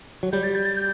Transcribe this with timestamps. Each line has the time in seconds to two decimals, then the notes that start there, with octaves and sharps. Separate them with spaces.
0.23 F#3
0.32 G3 G6
0.43 A6
0.55 G6
0.65 A6
0.76 G6